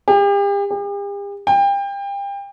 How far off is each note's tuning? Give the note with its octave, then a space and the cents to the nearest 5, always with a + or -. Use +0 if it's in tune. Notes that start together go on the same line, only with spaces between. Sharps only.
G4 +40
G4 +45
G5 +30